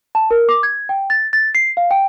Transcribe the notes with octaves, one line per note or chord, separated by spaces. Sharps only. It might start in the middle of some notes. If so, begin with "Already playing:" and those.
A5
A#4
D6
G#6
G5
A6
A6
C7
F5
G5